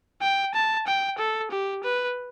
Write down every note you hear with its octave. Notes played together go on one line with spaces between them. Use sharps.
G5
A5
G5
A4
G4
B4